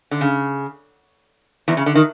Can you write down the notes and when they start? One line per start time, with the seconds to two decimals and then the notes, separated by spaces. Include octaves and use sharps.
0.11 D3
0.21 C#3
1.68 E2 E3
1.77 C#3
1.86 D3
1.95 D#3